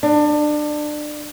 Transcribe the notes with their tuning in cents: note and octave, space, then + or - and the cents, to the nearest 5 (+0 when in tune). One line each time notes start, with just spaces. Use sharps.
D4 +25